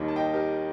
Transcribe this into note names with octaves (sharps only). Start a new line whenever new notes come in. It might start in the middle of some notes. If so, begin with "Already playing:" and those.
Already playing: D#2 D#3 G3 A#3
A5
D#5 G5
G4 A#4